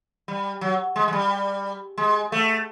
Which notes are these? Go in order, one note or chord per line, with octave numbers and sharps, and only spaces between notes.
G3
F#3
G#3
G#3
G3
G#3
A3